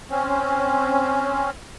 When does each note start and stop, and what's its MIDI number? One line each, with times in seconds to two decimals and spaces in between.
0.10 1.50 60
0.10 1.50 61